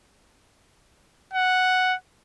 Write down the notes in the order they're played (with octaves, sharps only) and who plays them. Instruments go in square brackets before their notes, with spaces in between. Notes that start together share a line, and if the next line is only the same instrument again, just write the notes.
[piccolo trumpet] F#5